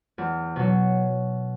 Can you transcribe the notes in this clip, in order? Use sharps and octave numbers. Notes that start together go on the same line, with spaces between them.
E2
B2 F#3